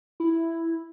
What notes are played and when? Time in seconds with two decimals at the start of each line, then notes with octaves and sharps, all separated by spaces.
0.20 E4